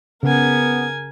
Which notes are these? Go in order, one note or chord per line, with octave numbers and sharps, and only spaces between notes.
C#3 B3 A#4 G#5